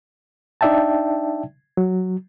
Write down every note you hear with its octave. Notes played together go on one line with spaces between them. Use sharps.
D4 D#4 D5 E5 G5 A5
F#3